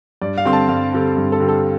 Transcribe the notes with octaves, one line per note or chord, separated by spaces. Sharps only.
G2 D5
F5
D3 G3 C4 C6
A5
G2 F5
D3 G3 C4
G2
A4
D3 G3 C4
A4